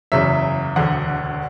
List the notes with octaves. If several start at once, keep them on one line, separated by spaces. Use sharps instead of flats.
F#1 E2 C#3 F#3 E5
E1 D2 D3 F#5